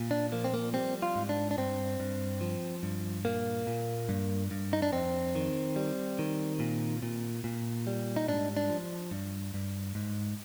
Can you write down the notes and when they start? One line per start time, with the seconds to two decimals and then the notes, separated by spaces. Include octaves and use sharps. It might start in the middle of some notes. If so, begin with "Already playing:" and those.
Already playing: A#2
0.11 D4
0.32 F3 A#3
0.44 C4
0.54 A#3
0.74 G3 C4
1.02 F4
1.16 G#2
1.29 D4
1.51 D4
1.58 G2 C4
2.00 G2
2.41 F3
2.83 G2
3.25 A#2 A#3
3.67 A#2
4.09 G2
4.51 G2
4.73 D#4
4.82 D4
4.92 F2 C4
5.35 D#3
5.76 G3
6.19 D#3
6.60 A#2
7.03 A#2
7.44 A#2
7.87 G3
8.16 D#4
8.28 G#2 D4
8.57 D4
8.69 F3
9.11 G2
9.54 G2
9.95 G#2